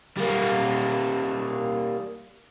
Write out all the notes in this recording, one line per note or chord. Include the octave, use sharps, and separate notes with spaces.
G3 A#3